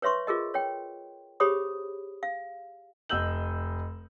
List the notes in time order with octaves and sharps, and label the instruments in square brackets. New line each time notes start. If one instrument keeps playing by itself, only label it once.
[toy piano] B4 C#5 E5 C6 C#6
F4 G#4 A#4 D#5
C#5 G5
G4 G#4 C5 C#5 B5 D#6
F5
[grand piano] F1 D#5 E6 G6 F#7